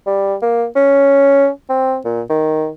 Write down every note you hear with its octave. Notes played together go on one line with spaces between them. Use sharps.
G3
A#3
C#4
C4
A#2
D#3